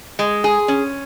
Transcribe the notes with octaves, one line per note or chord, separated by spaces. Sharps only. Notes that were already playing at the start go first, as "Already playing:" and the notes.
G#3
G#4
C#4